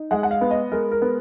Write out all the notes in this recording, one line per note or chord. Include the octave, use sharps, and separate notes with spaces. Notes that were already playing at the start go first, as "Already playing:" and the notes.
Already playing: D#4
G#3 F#5
F#5
F5
B3
D#5
G#3 A#4
A#4
B3